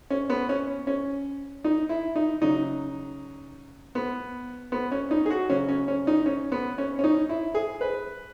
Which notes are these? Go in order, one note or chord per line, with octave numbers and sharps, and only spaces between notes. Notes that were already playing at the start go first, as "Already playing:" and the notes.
C#4
B3
C#4
C#4
D#4
E4
D#4
C#3 F#3 D#4
B3
B3
C#4
D#4
G#4
F#4
C#3 F#3 C#4
C#4
C#4
D#4
C#4
B3
C#4
C#4
D#4
E4
G#4
B4